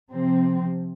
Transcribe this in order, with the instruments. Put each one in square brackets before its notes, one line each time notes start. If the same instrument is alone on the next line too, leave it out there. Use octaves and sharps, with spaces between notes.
[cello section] C3 F3 C4